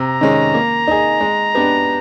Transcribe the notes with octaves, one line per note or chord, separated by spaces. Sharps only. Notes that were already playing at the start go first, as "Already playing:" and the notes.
Already playing: C3 A#5
D#3 G#3 C#4
A#3
D#4 G#4
G#3
B3 D4 G4 B4